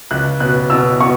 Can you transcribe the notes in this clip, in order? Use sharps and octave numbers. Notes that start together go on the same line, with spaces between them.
C#2 F#6
B2 F#6
B2 E6
B3 C#6